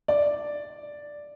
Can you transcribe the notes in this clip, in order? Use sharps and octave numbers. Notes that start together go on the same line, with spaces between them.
D5